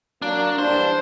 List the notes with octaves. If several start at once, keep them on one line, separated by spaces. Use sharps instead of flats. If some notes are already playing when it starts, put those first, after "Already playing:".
F#3 A#3 D4
E3 G3 D4 C5